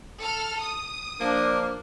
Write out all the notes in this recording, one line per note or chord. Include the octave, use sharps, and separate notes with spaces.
A4 F6
D#6
F3 A#3 D4